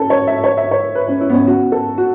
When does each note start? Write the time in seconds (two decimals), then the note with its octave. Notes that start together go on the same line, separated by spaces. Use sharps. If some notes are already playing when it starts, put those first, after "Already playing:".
Already playing: C#4 E4 A4
0.10 C#5
0.27 E5
0.44 C#5
0.57 E5
0.71 C#5
0.95 B4
1.08 C#4
1.21 E4
1.30 B3
1.34 C#4
1.47 F#4
1.72 A4
1.98 F#4